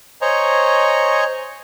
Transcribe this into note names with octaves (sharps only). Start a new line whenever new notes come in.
C5 C#5 D#5 G#5 A#5 C#6